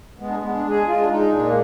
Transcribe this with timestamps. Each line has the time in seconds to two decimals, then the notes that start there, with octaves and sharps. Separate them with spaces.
0.20 G#3 B3
0.29 D4
0.36 B3
0.42 G#3
0.52 D4
0.64 G#3
0.70 G#4
0.87 G#3 F4
1.00 D4
1.10 G#3 D#4
1.32 A#2 D4
1.46 A#3